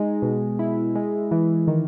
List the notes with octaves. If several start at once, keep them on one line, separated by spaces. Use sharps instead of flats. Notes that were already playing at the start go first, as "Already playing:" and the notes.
Already playing: G#3 D#4
B2
E4
G#3
E3
D#3